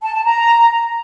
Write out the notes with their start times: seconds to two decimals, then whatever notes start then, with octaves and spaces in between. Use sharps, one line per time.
0.02 A5
0.13 A5
0.24 A#5